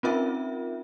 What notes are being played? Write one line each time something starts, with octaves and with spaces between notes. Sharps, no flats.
C4 C#4 D#4 F4 A#4 E5